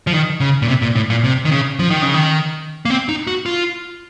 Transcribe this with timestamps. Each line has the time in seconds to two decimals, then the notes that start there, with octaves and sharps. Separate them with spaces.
0.07 F3
0.13 D#3
0.40 C#3
0.62 A#2
0.68 C3
0.82 A#2
0.96 A2
1.10 A#2
1.24 C3
1.45 D#3
1.51 C#3
1.79 F3
1.91 D#3
2.02 C#3
2.14 D#3
2.85 A#3
2.90 C4
3.09 D#4
3.27 F#4
3.46 F4